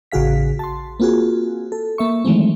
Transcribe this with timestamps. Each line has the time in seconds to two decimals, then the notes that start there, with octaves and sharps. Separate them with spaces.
0.12 A1 C#3 F#4 G#4 F5 B6
0.59 A5 C6
1.00 A#3 C4 F4 F#4 G#4
1.72 A4
1.98 A#3 E5 C#6
2.25 D#3 E3 F#3 G#3 A3 C4